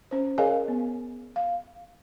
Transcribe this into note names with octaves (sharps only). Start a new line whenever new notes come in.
C#4 C5
G#4 A#4 C#5 D#5 F5 G#5
B3
F5